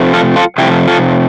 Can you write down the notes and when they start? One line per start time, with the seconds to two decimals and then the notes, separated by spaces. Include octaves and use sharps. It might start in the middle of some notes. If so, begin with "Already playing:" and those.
Already playing: C3 F3 A3
0.13 F4 A4
0.36 F4 A4
0.58 C3 F3 A3 E4 G4
0.87 F4 A4